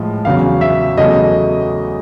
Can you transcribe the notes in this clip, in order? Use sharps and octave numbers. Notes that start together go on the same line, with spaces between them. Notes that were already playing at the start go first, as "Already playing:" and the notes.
Already playing: A2 F3 G#3
E2 C#3 F#3 F5
E5
E2 C#3 F#3 A3 D#5